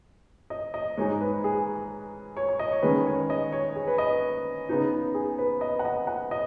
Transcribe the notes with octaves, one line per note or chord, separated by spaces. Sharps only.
D#5
D#5
G#2 G#3 D#4 C#5
B4
G#4
C#5
C#5
D#5
C#5
D#3 G#3 C#4 B4
C#5
D#5
C#5
G#4
B4
D#5
B4
C#3 B3 D#4
G#4
B4
D#5
F#5
D#5
F#5
D#5